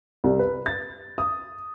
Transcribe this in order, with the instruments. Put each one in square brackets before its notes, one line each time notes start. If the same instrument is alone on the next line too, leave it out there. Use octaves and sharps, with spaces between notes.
[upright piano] C2
B4
A6
D#6